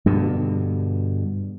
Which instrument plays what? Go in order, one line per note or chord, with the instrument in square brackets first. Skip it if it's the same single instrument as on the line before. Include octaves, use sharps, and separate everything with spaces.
[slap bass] G2 B2 D3